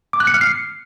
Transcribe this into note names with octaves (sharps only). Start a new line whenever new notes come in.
D6
F#6
C#7
F6
C7